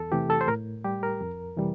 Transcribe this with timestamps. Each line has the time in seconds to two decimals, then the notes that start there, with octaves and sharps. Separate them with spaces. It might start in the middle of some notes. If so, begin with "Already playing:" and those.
Already playing: E2 A4
0.12 C3 E3 A3 G4
0.30 A4
0.41 C5
0.48 A2 A#4
0.84 G3 G4
1.03 A#4
1.21 F2
1.57 C3 E3 G3